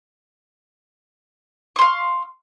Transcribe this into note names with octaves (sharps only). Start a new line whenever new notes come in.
F5 C6 C#6